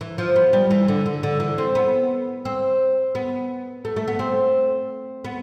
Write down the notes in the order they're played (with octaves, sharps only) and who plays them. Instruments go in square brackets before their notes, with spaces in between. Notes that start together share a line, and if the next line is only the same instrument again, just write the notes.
[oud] E3
F3
B3
G3
E3
D3
D3
D3
E3
C4
B3
C4
B3
A3
A3
B3
C4
B3